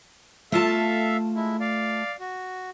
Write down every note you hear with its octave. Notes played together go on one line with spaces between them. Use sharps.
A3 F4 A4 E5 F5 A5
G#3 E4
D5 F5
F#4